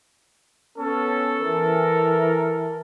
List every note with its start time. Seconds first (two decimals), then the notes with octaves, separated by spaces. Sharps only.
0.78 B3 C#4 A4
1.39 E3 A#4